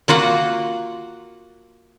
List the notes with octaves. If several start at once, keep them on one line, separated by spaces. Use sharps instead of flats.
A#3 F4 F#4 F#5